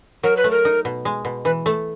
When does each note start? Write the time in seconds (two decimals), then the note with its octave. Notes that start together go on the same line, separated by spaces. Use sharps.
0.23 F#3 A#4
0.37 B4
0.44 A3
0.51 A#4
0.65 D#4
0.85 B2
1.05 G#3
1.25 B2
1.45 E3 B4
1.66 A3 A4